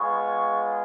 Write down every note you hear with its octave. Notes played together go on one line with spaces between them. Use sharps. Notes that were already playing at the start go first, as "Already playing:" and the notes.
Already playing: G#3 B3 F4 C#5 C#6